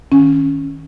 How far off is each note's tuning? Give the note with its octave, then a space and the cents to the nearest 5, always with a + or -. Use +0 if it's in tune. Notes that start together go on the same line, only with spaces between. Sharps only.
D#3 +0 C#4 +0